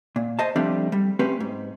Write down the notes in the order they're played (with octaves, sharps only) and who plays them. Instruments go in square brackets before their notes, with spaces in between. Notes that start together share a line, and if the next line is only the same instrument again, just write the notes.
[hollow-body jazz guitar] A#2
C5 D#5 A5
F3 G3 A3 C4 D4
G3
A3 C4 C#4 G4 B4
G#2